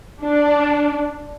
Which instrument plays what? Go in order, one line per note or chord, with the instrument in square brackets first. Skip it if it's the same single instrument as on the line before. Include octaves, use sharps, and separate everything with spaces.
[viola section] D4